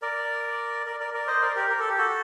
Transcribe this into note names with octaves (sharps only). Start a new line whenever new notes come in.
A#4 D5
A#4 D5
A#4 D5
A#4 D5
C5 D#5
A#4 D5
G4 A#4
A#4
A4
G4
F#4 A4